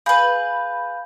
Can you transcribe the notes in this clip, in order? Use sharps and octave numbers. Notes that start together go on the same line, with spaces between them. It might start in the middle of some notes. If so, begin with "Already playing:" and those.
G#4 B4 F5 B5 G6